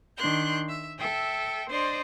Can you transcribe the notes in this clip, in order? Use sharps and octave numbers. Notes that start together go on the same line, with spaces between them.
D#3 D4 C6 F#6 G6
E5
A4 E5 G5
D4 C5 D5 D#5 C6